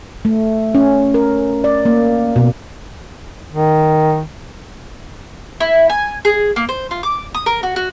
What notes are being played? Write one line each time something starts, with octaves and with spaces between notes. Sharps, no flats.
A3
C#4
A#4
D5
A#3
B2
D#3
E4
G#5
G#4
A#3
C5
F4
D6
D#6
A#4
F#4
F#4